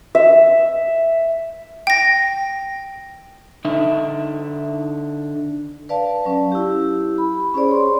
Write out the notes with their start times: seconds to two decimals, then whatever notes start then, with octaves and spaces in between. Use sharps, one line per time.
0.15 E5
1.87 G5 A#6
3.65 D3 D#4 E5
5.89 B4 D5 F5 A5
6.25 F#3 C#4
6.52 E4 G4
7.18 B5
7.54 C#4 G#4 C5 D5
7.68 C#5 C6